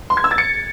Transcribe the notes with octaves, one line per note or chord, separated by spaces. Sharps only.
C6
G#6
E6
A6
C#7